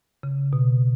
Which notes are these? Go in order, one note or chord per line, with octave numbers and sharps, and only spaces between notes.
C#3
B2